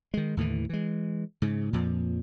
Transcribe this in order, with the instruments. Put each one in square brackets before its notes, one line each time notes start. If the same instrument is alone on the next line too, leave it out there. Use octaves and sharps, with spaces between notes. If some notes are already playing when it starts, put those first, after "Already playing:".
[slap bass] D#3 G#3
D#2 A2 D3 E3
E3 G#3
G#2 C#3
F2 A#2 F3